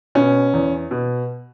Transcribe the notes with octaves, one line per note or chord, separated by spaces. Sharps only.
B2 C#4
E2
B2